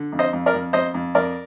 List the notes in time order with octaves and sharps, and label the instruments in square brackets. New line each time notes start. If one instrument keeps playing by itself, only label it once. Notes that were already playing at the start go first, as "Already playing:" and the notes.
Already playing: [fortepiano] D3
F2
C5 D#5
F2
A#4 D5
F2
F2 C5 D#5
F2
F2 A#4 D5